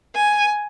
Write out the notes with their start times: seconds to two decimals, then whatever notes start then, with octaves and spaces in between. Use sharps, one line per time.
0.16 G#5